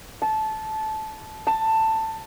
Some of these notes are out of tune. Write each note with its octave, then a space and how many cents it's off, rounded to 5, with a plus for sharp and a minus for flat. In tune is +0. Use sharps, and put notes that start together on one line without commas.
A5 -15
A5 +15